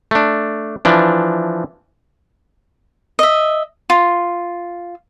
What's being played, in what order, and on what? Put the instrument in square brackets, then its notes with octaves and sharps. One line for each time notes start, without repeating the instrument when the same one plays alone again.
[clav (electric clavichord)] A3 D4
E3 F3 D4
[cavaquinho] D#5 E5
F4